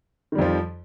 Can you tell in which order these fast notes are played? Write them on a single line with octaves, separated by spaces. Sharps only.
D#3 G3 F2 F3